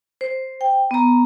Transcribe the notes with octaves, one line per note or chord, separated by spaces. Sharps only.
C5
G5
B3 A#5